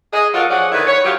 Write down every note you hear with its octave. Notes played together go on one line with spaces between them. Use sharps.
G#4 D#5
F#3 F4 A4 A#4 F5 F#5
F3 C#4 G#4 D5 F#5
D3 D#3 E4 B4
C#5
F#3 F4 G4